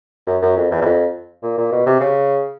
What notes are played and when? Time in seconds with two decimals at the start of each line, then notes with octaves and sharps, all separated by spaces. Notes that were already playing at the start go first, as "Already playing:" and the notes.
0.27 F#2
0.42 F#2
0.57 F2
0.71 E2
0.81 E2
0.85 F2
1.43 A#2
1.58 A#2
1.72 B2
1.86 C3
2.00 C#3